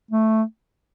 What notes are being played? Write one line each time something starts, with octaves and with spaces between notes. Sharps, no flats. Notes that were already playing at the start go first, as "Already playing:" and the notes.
A3